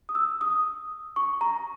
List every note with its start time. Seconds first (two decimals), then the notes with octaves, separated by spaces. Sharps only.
0.09 D#6
0.15 E6
0.41 D#6
1.16 C#6
1.41 A#5